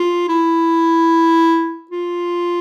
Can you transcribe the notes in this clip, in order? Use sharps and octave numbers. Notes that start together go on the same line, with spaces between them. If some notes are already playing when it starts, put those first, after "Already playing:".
Already playing: F4
E4
F4